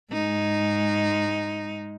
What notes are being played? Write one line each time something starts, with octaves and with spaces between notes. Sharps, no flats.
G#2 G#3 D#4